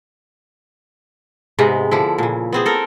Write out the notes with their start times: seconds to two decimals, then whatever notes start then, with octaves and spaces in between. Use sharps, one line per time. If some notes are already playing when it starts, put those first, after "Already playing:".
1.59 G#2 C3 G#3 B3
1.91 D3 F3 E4
2.18 A#2 C#3
2.53 B3 C4 G#4
2.66 A4 A#4